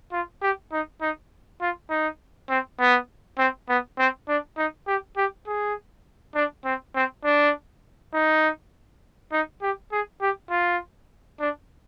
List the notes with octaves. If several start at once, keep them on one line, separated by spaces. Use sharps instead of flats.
F4
G4
D#4
D#4
F4
D#4
C4
B3
C4
B3
C4
D4
D#4
G4
G4
G#4
D4
C4
C4
D4
D#4
D#4
G4
G#4
G4
F4
D4